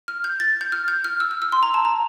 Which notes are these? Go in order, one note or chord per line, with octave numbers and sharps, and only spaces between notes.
F6
G6
A6
G6
F6
G6
F6
E6
F6
E6
C6
A#5
A5
A#5